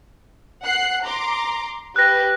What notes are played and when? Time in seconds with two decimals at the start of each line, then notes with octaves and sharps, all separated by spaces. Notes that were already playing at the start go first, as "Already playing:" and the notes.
0.62 F#5 F#6 C7
1.04 A#5 C6 D6
1.96 G4 B4 F#6 A#6